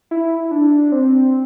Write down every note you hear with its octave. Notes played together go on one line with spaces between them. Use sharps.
E4
D4
C4